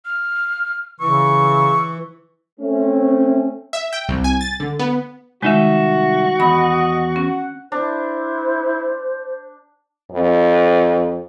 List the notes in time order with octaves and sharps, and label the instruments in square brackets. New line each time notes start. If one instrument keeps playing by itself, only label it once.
[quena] F6
[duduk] C#3 [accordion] E3 [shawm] C#6 [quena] E6
[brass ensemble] A3 C4 C#4
[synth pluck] E5
G5
C2
G#5
A6
D3
B3
[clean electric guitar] C2 D#4 E5 [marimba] D#3 G#3 [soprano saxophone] F#4
[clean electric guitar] E2 [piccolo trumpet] D#5 [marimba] B5
[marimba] C#4 [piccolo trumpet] F#5
[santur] D4 [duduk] E4 [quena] C5
[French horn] F2